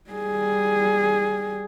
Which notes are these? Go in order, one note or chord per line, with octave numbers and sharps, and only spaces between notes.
G3 G#4